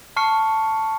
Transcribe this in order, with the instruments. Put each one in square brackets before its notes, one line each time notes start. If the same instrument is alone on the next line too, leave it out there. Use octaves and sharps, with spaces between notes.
[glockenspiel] A5 C#6 F6 C7 C#7